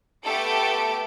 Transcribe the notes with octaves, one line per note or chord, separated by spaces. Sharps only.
A3 B3 G4 A4 D7